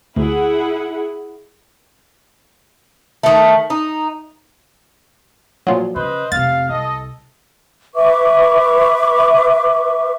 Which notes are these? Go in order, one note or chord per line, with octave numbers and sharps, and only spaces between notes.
D2 E4 G#4 F#5
D#3 A3
D#4
A#2 F3 F#3
C#3 B4 C5 D#5
F1 C3 F5 A6
C2 A4 D#5
B4 E5 C#6 D6